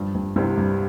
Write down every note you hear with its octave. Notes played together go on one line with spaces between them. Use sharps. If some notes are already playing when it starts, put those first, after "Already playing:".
Already playing: G2 F3
G2
C2 G2 C3
G2